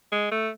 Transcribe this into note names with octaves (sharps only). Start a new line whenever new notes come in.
G#3
A3